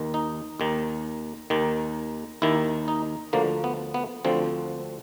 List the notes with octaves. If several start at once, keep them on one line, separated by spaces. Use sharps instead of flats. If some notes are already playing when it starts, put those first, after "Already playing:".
Already playing: D#2 D#3
D#4
D#2 D#3
D#2 D#3
D#2 D#3 E4
D#4
D2 D3 F3 A#3
B3
B3
D2 D3 F3 C4